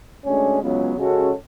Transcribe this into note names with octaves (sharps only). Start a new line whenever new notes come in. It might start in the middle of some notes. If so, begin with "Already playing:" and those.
D2 D3 G#3 C#4
C#2 C#3 F#3 B3
C#3 G#3 C#4 F#4 A4